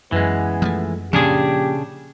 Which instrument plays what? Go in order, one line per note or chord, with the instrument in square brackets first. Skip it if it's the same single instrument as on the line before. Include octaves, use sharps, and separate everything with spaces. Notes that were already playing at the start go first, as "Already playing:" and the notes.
[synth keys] F#2 [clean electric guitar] E3 G#3 [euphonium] B3
[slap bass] F3 F#3 A3
[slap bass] A#2 F3 [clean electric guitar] C#3 D4 G#4 [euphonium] G4